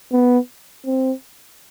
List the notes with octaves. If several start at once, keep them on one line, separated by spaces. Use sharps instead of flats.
B3
C4